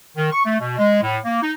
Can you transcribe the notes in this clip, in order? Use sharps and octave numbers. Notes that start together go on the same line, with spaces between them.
D#3
C#6
A3
B2
G#3
A2
A#3
D#4